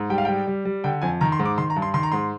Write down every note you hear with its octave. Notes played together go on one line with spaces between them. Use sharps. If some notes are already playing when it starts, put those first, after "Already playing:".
Already playing: G#2
G3 G5
F5
G3 G5
G3
G3
D3 G5
F2 G#5
D#3 A#5
C6
G#2
D6
D#3 C6
A#5
G2
C6
D#3 C6
A#5
G#2 C6